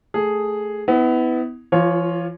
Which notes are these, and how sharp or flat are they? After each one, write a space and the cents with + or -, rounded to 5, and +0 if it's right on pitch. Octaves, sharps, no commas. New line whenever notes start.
A3 -5 G#4 +0
B3 +20 E4 -25
F3 -45 F4 +0 C#5 +0